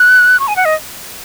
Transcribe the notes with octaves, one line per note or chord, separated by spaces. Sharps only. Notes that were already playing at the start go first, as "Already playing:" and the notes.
Already playing: F#6
C#6
G#5
F#5
D#5